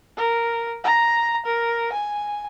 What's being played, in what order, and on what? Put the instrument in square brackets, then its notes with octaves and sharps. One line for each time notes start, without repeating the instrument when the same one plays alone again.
[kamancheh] A#4
A#5
A#4
G#5